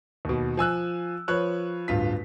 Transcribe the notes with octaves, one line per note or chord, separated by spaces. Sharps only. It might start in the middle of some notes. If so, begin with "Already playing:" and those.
D#2 B2
F3 G#5 E6 F#6
F3 B4 C#5 F#6
D1 G2 F4 B6